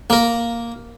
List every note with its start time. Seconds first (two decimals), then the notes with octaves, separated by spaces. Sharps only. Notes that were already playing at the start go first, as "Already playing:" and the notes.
0.10 A#3 A#4